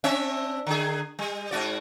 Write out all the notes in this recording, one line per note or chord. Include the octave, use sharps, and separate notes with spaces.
C4 D4 E5
D3 G#4
G3
G#2 F#4 D5